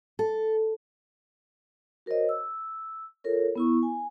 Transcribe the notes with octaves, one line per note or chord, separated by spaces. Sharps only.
A4
F#4 A#4 C5 C#5 D#5
E6
F4 A4 A#4 C#5
B3 E4 C#6
G#5